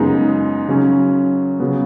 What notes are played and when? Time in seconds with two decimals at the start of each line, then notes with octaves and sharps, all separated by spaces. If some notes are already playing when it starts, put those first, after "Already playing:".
Already playing: F#2 C#3 G#3 B3 D#4
0.68 C#3 F#3 C#4
1.60 C#3 F#3 B3